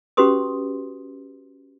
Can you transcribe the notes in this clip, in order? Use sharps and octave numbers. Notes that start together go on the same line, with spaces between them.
C#4 F#4 G4 B4 C6 D#6